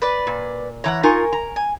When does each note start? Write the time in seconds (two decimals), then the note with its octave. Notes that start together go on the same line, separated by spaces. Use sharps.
0.02 B4 D5
0.27 A#2
0.84 E3 C#5 F#5 A5 A#5
1.03 D#4 F4 A#4 G#5 C#6
1.33 A#5
1.56 G#5